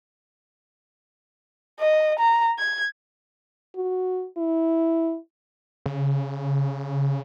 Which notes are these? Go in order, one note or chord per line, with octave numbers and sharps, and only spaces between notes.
D#5
A#5
G#6
F#4
E4
C#3